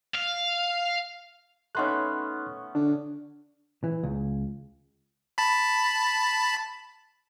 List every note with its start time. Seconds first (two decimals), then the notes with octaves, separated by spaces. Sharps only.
0.14 F5
1.75 A3 B3 C#4 D#4 C6 F#6
2.75 D3 D4
3.84 E3
4.03 C#2
5.38 A5 B5